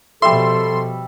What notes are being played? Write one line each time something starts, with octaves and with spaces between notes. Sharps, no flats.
B2 F3 G3 A4 E5 C6